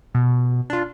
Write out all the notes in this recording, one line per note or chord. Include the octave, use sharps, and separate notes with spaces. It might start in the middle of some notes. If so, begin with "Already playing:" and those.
B2
D4 F4